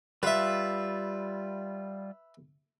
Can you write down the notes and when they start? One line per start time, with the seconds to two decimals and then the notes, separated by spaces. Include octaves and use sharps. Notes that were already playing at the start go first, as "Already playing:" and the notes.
0.23 G3 F4 B4 E5